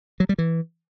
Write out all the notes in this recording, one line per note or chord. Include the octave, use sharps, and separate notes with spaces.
F#3
G3
E3